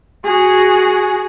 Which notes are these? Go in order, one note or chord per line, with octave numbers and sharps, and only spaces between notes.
F#4 G#4